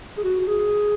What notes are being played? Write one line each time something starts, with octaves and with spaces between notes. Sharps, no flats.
G#4
F#4
F#4
G#4